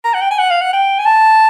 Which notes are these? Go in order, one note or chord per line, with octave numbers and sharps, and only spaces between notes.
A#5
F#5
G5
G#5
F#5
F5
F#5
G5
G#5
A5